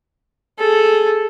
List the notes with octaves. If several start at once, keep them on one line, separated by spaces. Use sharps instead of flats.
G#4 A4